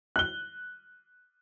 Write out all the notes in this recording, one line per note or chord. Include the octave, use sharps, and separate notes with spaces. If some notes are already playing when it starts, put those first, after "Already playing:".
F#6 G7